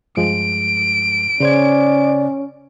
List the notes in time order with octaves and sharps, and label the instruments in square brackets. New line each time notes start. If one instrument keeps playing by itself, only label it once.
[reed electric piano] G2 F3 G#3 [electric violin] D7
[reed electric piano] C#3 C5 G#6 [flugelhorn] C#4 [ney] D5